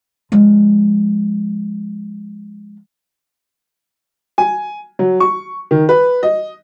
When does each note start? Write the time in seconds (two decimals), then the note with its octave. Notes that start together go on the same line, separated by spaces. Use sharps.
0.32 F3 G#3
4.38 G#5
4.99 F#3
5.20 C#6
5.71 D#3
5.89 B4
6.23 D#5